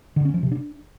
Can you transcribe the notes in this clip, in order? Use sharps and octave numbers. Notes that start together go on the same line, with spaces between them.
D3
C#4
F3
C3
D4